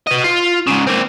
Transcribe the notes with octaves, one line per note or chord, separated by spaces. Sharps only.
B4 D#5
F4
G#2 C#3
A#3 C4